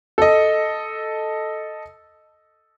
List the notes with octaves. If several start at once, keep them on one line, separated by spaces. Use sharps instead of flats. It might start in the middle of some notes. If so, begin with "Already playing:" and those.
A4 D#5